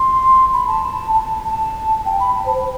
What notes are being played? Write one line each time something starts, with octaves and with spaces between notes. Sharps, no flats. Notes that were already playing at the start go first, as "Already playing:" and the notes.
Already playing: C6
B5
A5
A5
A5
G5
B5
A5
C5
C5